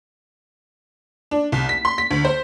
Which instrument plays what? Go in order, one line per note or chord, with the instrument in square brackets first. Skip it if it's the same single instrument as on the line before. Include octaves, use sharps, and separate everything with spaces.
[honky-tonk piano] D4
C2
B6
C6
B6
D2
C5